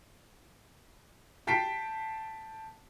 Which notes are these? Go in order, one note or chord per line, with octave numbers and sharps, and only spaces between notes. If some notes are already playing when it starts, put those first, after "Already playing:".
G5 A5 B6 C7 D7